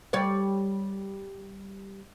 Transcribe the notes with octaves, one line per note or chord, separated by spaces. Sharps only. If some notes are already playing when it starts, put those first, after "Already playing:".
G3 C#5 D5